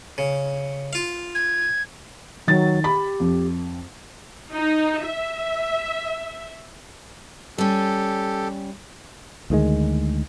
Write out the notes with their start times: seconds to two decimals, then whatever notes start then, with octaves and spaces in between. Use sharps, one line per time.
0.18 C#3
0.93 F4 F5
1.35 G#6
2.47 D#3 F#3 A6
2.84 G4 B5
3.20 F2
4.51 D#4
5.05 E5
7.58 G3 C#4 G4 A4
9.50 D2 D#3 G3 G#3